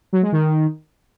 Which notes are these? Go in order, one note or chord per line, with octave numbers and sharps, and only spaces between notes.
F#3
G#3
D#3